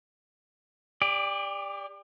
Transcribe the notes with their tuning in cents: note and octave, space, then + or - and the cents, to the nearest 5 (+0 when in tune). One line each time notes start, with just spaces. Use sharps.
G4 +35 D5 +0